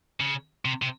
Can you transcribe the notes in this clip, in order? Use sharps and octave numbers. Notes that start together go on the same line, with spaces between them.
C#3
C3
C3